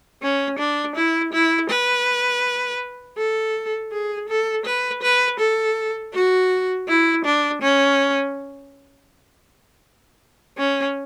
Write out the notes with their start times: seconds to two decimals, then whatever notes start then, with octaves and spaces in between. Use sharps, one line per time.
0.22 C#4
0.59 D4
0.96 E4
1.33 E4
1.70 B4
3.18 A4
3.92 G#4
4.29 A4
4.65 B4
5.03 B4
5.40 A4
6.13 F#4
6.88 E4
7.25 D4
7.62 C#4
10.58 C#4